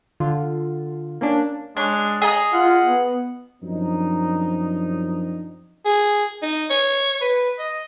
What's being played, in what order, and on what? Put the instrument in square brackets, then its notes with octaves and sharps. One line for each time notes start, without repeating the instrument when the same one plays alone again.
[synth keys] D3 F4
A#3 C#4 D4
[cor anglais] G#3 [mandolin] D4 C#5
[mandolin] G#4 D#5 A#5
[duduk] F4 [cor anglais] F#5
[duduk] B3
[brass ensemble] F#2 F3 C4 D4 D#4
[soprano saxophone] G#4
D#4
C#5
B4
D#5